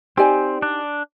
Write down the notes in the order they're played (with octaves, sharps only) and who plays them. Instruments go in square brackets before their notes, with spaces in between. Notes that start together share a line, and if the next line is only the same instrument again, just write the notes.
[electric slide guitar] C4 [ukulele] D#4 G4 D5 G#5
[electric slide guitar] D4